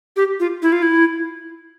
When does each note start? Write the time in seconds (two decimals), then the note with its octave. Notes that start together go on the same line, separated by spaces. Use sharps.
0.16 G4
0.40 F4
0.62 E4
0.72 F4
0.82 E4